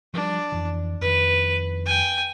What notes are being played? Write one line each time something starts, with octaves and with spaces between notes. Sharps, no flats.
F3 G3 D4
F2 E3
F2 D#3 B4
G5 G#5